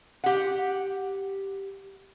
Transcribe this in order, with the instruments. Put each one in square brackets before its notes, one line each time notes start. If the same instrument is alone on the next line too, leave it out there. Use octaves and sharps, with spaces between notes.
[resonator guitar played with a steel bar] G4 F#5